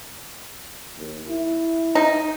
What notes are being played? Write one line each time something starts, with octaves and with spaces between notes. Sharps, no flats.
D#2
E4
D#4